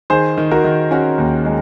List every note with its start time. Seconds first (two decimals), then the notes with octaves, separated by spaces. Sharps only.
0.10 D#3 G#4 C5
0.38 D#3
0.51 F#4 A#4
0.64 D#3
0.91 C#4 F#4
1.18 D#2
1.45 G#3